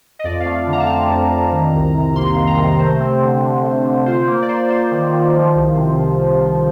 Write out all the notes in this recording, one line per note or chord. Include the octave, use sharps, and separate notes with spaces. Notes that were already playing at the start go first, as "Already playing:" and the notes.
D#5
F2 D5
F5
A3
D3
A#5
A5
C4 A#5
F2
F2
D#3
C2
C3
A#3 C6
D#3
A#5
C3
A3 C5
C4
D3
D3
A3
D3
F4 C5
A#3
D5
A#3 C5
A#3 C5
D#3
D#3
F3
C2
C3
F3
F3
F3